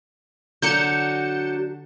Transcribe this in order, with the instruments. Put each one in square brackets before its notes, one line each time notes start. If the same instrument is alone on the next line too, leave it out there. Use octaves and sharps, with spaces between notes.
[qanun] D3 [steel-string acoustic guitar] F#3 D4 F#4 [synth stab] G6 C#7 E7